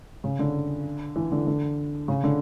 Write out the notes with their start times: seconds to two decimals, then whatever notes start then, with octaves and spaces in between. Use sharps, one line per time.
0.24 C#3
0.39 D3
1.16 E3
1.32 D3
1.47 D3
2.08 C#3
2.24 D3